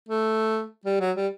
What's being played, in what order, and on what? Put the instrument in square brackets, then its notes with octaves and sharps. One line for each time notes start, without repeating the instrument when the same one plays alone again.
[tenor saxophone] A3
G3
F#3
G3